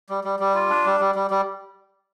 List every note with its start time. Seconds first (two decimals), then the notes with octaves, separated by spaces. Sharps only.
0.10 G3
0.24 G3
0.40 G3
0.54 F4
0.70 D4
0.86 G3
1.00 G3
1.15 G3
1.31 G3